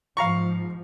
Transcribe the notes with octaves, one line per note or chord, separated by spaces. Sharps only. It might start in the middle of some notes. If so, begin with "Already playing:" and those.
G#2 F3 F5 A#5 C#6